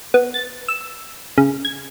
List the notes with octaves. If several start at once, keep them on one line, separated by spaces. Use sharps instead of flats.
B3
A6
E6
C#3
G#6